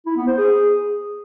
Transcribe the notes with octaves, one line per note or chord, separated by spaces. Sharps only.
E4
B3
C5
G#4